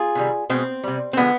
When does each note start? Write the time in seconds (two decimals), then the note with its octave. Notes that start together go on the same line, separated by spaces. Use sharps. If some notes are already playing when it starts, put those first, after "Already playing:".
Already playing: F4 G#4
0.15 C3 D#3 G3
0.49 B2 G#3 C4
0.83 C3 G3
1.13 C4
1.17 D3 F3 G#3 B3